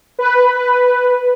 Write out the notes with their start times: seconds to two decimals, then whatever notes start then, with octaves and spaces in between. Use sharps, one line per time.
0.19 B4